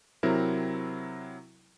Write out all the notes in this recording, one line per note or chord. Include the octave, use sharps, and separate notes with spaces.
C3 F#3 C4 E4 A#4